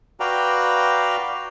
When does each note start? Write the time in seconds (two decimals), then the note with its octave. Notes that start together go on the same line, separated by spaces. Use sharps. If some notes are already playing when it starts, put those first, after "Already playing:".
0.20 F#4 B4 D5 F5 G5 A#5